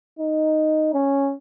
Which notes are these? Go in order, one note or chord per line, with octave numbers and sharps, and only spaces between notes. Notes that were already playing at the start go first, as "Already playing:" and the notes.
D#4
C#4